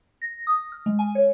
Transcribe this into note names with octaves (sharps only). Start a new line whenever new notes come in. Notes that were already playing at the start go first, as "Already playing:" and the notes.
A#6
D#6
F6
G#3
G#5
C#5